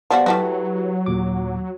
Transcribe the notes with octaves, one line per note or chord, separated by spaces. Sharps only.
F3 G3 B3 F#4 D5 F#5
F#3 G3 A3 E4 F#4 G4 B4
D#2 A#2 D6